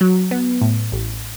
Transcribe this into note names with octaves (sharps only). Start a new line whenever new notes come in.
F#3
B3
A2
A1